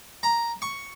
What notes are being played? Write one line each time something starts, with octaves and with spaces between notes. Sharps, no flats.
A#5
C#6